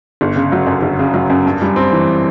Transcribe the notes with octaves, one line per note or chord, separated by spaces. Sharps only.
G1
C#3
F#3
F#2
G1
C#3
F#3
F#2
G2
G3
C4
E3